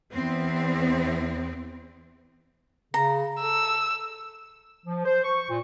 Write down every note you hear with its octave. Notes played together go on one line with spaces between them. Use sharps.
E2 B3 C4
C#3 A#5
A4 E6
F3
C5
C#6
A#2